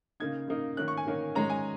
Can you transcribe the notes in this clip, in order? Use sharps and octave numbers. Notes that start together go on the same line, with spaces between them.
C#3 A#3 D#4 G#6
C#3 A#3 D#4
D#3 A#3 C#4 F#6
C#6
G#5
D#3 A#3 C#4
D#3 G#3 C#4 A#5
G#5